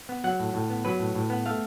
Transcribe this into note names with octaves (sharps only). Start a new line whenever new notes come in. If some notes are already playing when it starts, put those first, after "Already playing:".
B3
F#3 F#5
A2
A2
B3
F#3 B4
A2
A2
B3
A3 F5